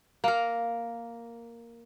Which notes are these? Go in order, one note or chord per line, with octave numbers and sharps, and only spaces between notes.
A#3 A#4